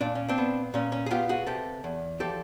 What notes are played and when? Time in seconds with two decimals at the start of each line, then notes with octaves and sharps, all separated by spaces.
0.01 A#2 D4
0.15 C#4
0.28 C4 D4
0.38 B3
0.74 A#2 C#4
0.92 C#4
1.06 G#4
1.11 B3 F4 G4
1.29 F#4 G#4
1.46 C3 G4 A4
1.84 E2
2.20 F3 G4 A4